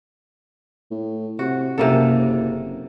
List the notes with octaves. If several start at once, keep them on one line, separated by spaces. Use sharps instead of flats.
A2
C3 F#4
F#1 C3 A#3 A4